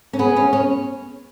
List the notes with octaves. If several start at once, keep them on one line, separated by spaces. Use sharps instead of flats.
C#4
B3 G#4
C#4
C#4